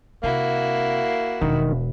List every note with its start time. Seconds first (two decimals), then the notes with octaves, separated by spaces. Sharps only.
0.23 C3 A#3 E4 F#4
1.41 E1 D#3 D4